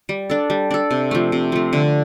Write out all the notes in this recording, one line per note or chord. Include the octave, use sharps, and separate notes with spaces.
G3
D4 A4
G3
D4 A4
C3
F3 A3
C3
F3 A3
D3